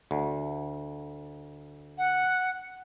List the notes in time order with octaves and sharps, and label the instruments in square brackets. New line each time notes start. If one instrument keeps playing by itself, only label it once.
[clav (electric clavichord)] D2
[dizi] F#5